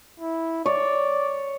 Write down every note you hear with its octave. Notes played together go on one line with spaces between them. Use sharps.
E4
C#5 D5